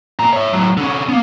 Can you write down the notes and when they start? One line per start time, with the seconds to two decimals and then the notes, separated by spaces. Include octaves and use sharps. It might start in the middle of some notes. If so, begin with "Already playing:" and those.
0.19 A#2 A#5
0.33 C#5 E5
0.53 A2 F#3
0.77 D3 C#4
1.09 A#3 B3